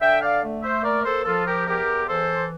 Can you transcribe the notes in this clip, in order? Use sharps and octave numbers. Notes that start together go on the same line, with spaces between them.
D3 E5 G5
D5 F5
A3
C5 E5
A#3 A#4 D5
A4 C5
F3 F4 A4
G4 A#4
E2 G4 A#4
E3 A4 C5